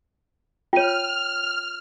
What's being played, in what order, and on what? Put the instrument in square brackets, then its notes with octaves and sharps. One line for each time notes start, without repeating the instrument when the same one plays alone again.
[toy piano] F4 C#5 [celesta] G5 D#7 [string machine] F6